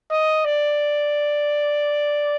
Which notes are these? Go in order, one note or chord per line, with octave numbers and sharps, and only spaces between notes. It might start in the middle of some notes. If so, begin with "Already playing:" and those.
D#5
D5